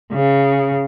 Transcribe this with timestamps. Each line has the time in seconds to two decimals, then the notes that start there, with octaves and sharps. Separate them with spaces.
0.13 C#3